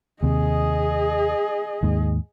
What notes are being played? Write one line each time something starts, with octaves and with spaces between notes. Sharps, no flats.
D#2 C3 G#4 D#5
D#2 G#2